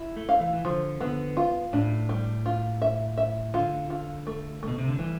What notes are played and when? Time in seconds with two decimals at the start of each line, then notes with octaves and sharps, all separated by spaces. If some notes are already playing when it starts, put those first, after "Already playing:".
Already playing: E4
0.16 A3
0.29 F5
0.41 E3
0.53 E3
0.65 D3 F3
1.01 D3 B3
1.37 F4
1.73 A2 D4
2.09 G3
2.46 F4
2.82 E5
3.18 E5
3.54 D3 F4
3.90 F4
4.27 A3
4.63 B2 A3
4.78 C3
4.88 D3
4.99 E3 G3